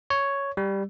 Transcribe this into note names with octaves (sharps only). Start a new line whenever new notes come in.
C#5
G3